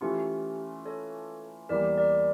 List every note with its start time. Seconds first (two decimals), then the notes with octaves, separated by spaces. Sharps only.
0.01 E3 A3 C#4 F4 G4
0.86 A4 C#5
1.69 E2 E3 G3 A#3 A#4 D5
1.98 A#4 D5